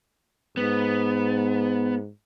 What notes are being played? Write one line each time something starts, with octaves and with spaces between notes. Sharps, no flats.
G#2 B3